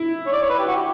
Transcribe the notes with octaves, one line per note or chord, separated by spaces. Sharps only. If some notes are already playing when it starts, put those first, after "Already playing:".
Already playing: E4
C#5
D5
C#5
B4
G4
F#4
G4